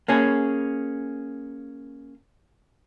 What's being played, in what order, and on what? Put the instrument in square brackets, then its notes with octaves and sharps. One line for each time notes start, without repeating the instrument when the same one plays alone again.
[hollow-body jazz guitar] A#3 C#4 G#4